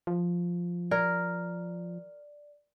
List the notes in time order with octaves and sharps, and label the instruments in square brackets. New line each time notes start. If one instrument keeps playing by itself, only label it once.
[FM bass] F3
[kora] A#4 [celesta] D5